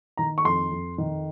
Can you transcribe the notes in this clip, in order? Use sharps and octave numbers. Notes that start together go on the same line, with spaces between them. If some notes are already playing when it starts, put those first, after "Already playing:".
D#3 A#5
C#6
F2 C6
F2
D#3